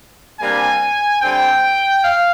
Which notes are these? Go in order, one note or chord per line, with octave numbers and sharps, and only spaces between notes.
C3 G3 A#3 D4 G#5
D3 G3 C4 G5
F5